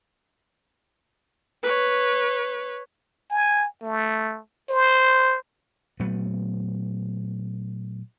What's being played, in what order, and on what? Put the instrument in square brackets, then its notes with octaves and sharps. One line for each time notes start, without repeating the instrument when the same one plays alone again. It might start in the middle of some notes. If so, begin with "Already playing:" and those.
[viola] B4 C#5
[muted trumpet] G#5
A3
C5
[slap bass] A#2 F#3 A3 B3